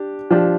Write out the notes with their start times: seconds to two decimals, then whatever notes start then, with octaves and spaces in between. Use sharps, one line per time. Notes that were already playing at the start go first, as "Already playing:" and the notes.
Already playing: D4 G4
0.31 F3 D4 G4